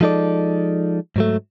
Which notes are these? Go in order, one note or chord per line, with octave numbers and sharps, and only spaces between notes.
F3 G#3 D#4 A4 D5
G#2 F#3 A3